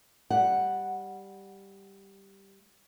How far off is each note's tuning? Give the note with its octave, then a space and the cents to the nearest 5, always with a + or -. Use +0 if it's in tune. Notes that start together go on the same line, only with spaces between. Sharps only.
G3 +0 F#5 +0